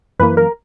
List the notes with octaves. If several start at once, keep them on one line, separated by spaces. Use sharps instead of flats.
F#2 E3 A#3 B4
A#4